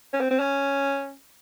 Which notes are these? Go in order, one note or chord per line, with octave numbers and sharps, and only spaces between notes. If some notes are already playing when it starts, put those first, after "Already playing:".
C#4
C4
C4
C#4